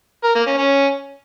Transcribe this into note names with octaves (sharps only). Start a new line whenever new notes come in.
A#4
A#3
C#4
C#4